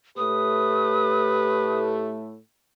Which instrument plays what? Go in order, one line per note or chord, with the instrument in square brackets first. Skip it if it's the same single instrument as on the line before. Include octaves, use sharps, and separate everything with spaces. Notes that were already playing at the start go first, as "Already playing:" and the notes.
[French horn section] A2 A3 [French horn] G4 [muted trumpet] B4 [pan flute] D#6